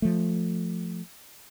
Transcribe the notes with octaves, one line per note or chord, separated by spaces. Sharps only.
F3 A3